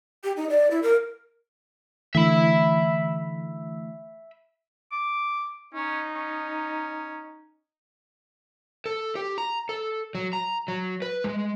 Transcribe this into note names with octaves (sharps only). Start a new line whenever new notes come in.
G4
D#4
D5
E4
A#4
D3 E3 A3 E5 B5
D6
C#4 D#4
C#4
A4
G4
A#5
A4
F#3
A#5
F#3
B4
G#3